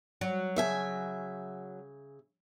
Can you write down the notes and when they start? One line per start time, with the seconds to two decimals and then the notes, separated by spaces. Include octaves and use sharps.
0.21 F#3
0.56 C#3 E5 G#5